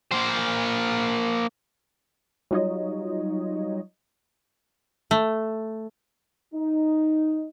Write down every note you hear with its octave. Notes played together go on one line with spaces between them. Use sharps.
A#3 C5
F#3 G3 D#4 F4 C#5 D#5
A3
D#4